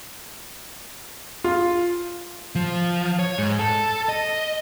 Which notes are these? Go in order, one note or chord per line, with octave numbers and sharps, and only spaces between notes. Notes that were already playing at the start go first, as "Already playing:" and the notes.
F4
F3
C#5
G#2
A4
D#5